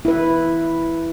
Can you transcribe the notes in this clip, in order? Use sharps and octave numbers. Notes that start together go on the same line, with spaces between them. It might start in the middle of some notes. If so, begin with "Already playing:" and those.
E4 B4